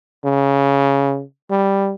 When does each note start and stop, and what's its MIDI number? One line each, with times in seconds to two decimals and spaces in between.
0.25 1.22 49
1.51 1.94 55